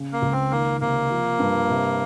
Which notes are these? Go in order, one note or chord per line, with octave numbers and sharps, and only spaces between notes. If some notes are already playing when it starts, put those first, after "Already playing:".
Already playing: C#3
A#3
C#2
C4
D#3 A#3
C3 A#3
F3
G2
C3